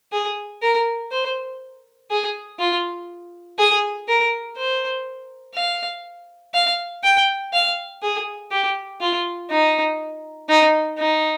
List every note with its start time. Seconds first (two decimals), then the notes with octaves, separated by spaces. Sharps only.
0.12 G#4
0.62 A#4
1.11 C5
2.11 G#4
2.59 F4
3.58 G#4
4.08 A#4
4.57 C5
5.55 F5
6.54 F5
7.04 G5
7.53 F5
8.02 G#4
8.51 G4
9.01 F4
9.50 D#4
10.49 D#4
10.98 D#4